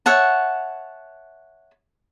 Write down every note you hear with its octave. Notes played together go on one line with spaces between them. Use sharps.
C#5 E5 F#5 A5